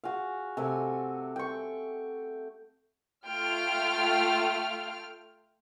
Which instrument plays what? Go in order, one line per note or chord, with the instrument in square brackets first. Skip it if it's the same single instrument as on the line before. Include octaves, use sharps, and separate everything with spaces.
[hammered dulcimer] F#4 G#4 F5
C3 A3 G#5
G5 C#6
[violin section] A3 F4 G5 F6